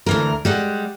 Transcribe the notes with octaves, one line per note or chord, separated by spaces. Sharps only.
D2 E3 A#4
G3 G#3 F#5